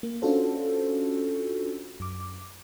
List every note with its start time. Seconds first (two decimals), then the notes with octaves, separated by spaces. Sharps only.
0.03 A#3
0.22 C#4 D4 F4 F#4 A4 C5
2.00 F#2 D6